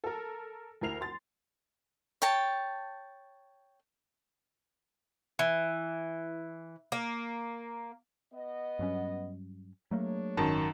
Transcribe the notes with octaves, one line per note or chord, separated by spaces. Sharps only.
A4 A#4
D2 E4 A#4 C7 F7
C6 A6
C#5 G5 A5
E3
A#3
B3 D#5
G2 F#3 C#4
F#3 A3 A#3 D4 G#4 C#5
G#1 F#2 D#3 A5